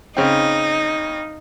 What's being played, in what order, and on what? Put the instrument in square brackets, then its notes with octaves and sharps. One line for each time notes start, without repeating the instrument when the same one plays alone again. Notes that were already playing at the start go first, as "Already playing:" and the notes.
[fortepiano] C#3 C4 [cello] D#4